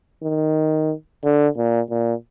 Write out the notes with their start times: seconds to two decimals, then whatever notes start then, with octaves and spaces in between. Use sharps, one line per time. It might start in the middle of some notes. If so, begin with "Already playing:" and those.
0.23 D#3
1.24 D3
1.57 A#2
1.91 A#2